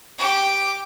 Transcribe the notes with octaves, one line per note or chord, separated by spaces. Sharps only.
G4 D6